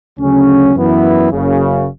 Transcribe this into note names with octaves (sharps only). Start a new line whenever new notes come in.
D2 C#3 F#3 C#4
F#2 E3 B3 E4
F#1 F#2 C#3